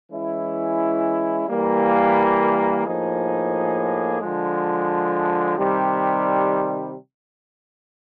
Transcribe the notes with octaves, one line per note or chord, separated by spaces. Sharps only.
E3 G#3 C#4 E4
E3 G3 A#3
A2 F3 A#3 D#4 G#4
D3 F3 G#3
C3 D#3 G3